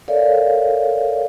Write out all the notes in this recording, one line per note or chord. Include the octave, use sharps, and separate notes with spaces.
A4 A#4 C#5 D5 E5 F5